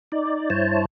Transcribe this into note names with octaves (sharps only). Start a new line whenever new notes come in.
D#4 D5
G2 E4 C5 C#5 A5